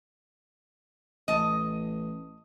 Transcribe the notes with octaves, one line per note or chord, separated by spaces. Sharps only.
A1 D#5 A5